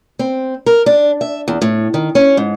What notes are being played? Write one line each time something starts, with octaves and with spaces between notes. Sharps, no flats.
C4
A#4
D4
E5
E2
A2
D#3
C#4
G#2